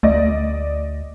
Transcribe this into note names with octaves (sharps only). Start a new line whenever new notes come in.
D2 A3 D5 D#5